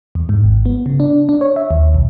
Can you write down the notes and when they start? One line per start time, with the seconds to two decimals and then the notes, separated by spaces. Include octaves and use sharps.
0.15 E2
0.29 G#2
0.44 G#1
0.65 B3
0.86 C#3
1.00 D4
1.29 D4
1.41 C#5
1.56 E5
1.71 D#2
1.94 B1